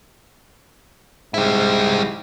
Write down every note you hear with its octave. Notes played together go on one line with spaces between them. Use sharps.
G#2 G3 E4